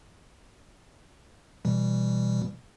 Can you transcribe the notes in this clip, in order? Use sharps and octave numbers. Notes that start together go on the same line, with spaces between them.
B2 E3 G3